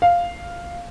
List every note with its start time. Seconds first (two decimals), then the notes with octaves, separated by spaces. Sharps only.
0.02 F5